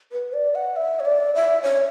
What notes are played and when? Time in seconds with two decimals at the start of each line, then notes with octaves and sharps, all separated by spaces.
0.12 B4
0.33 D5
0.55 F#5
0.76 E5
1.00 C#5
1.05 D5
1.35 E5
1.63 C#5